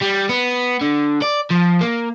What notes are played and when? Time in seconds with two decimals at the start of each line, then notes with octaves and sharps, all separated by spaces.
0.02 G3
0.29 B3
0.81 D3
1.22 D5
1.50 F3
1.81 A#3